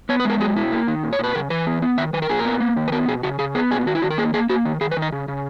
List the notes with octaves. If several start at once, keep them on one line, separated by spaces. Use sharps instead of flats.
B3 C#5
B4
G#3 A#4
F#3 G#4
B2 E4
A#3
D#3
A#2
C#5
A#2 B4
C#3 A#4
E3 B4
B3
B3
D#3 E5
D#3 B4
A#4
A#2 G#4
A#4
B3
A#3
D#3
B4
B3 A#4
B2 G#4
C#3 F#4
C#3 G#4
B3 G#4
A#2 G#4
D#3 F#4
E4
D#3 F#4
A#4
A#3 G#4
A#3 G#4
A#3 F#4
D#3
D#3 G#4
B4
D#3
D#5
C#3
C#3